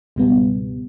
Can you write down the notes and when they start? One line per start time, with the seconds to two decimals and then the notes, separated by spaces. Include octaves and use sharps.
0.16 C#2 G#2 B2 G3 B3